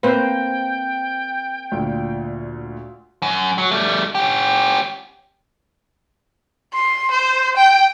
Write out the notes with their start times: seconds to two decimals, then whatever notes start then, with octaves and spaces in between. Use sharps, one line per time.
0.03 A#3 C4 B4 C5 G5
1.72 D2 A#2
3.22 F#2
3.58 F#3
3.71 G3 A3
4.15 C#4 G4
6.74 C6
7.11 C5
7.57 G5